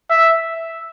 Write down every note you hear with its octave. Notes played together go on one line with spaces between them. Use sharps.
E5